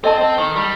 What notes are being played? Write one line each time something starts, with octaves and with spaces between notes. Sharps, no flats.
C4 A4 D#5 A5 C6
C4
D#3
G3